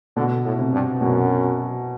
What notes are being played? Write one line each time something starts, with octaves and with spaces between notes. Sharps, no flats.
B2 D3
A2
C3
G2
F#2 B2